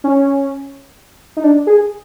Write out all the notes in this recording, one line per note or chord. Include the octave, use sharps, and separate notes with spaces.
C#4
D#4
D4
G#4